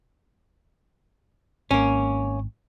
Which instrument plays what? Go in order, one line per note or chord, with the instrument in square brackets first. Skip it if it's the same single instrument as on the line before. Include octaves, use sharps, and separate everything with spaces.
[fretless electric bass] G#1 [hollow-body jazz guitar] A#3 C#4